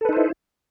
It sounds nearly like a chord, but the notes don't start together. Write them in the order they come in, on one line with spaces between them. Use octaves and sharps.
A4 B4 D#4 C5 E4